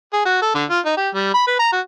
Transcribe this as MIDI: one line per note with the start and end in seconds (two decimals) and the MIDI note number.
0.13 0.22 68
0.25 0.39 66
0.42 0.50 69
0.55 0.65 50
0.70 0.79 65
0.86 0.95 63
0.97 1.09 67
1.15 1.33 55
1.34 1.44 83
1.47 1.58 71
1.59 1.68 82
1.73 1.81 66